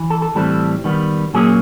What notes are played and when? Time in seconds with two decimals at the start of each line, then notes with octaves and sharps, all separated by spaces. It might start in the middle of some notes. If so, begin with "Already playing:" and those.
Already playing: E3
0.10 A4
0.22 A4
0.35 A2 E3 G3 C4 A4
0.84 D#3 G3 B3
1.34 A#2 F#3 A#3 C#4 G#4